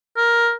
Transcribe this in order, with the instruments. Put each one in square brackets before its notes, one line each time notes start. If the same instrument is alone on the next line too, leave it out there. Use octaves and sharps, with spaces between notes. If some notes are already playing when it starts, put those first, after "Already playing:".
[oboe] A#4